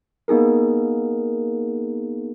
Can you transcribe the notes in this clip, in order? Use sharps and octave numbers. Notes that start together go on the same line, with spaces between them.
A#3 B3 D#4 G#4 A#4